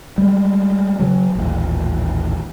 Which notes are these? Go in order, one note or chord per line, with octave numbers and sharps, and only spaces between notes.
G3 G#3
C#3 F#3
D#1 A1